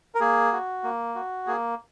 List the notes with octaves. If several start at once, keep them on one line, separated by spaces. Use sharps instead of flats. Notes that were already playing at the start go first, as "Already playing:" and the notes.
A#4
A#3 G#4
F#4
A#3
F#4
A#3 G#4